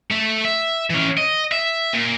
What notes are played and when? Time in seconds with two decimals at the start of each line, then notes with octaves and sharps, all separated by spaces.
0.12 A3 E5
0.45 E5
0.90 E3 C#4
1.17 D#5
1.52 E5
1.93 A#2